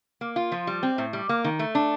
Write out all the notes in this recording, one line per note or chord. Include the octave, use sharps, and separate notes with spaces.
A#3
F4
F3
G3
C4
A2
G3
A#3
D#3
A3
D4